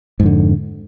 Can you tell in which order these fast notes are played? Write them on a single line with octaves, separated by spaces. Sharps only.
G#2 F2 D3